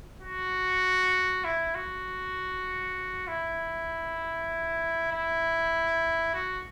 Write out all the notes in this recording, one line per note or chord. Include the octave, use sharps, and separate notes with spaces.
F#4
E4
F#4
E4
E4
F#4